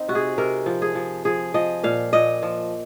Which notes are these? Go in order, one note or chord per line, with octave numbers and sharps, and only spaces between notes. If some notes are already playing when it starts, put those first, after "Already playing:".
Already playing: C4 D#4
C3 F#4
G#4
C3 A#4
F3
G#4
F3
F3 G#4
F3 D#5
A#2 F5
A#2 D#5
F3